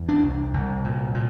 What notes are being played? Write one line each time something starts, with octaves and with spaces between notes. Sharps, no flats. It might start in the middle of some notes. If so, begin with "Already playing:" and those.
Already playing: E2
D4
C2
C2
A#2
A#2